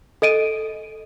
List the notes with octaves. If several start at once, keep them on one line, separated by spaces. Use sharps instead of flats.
A4 D#5 D7 D#7